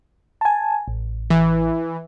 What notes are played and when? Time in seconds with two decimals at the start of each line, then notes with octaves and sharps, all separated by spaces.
0.41 G#5 A5
0.88 A1
1.30 E3